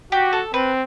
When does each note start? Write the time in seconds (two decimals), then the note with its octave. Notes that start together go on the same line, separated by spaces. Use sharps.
0.12 F#4 G4
0.33 A4
0.54 C4 B4